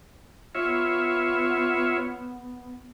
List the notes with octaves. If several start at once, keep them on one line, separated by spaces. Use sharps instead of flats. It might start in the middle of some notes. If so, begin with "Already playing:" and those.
B3 F4 C#5 E5